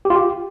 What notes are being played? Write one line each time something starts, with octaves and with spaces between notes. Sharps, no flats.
G4
F4
G4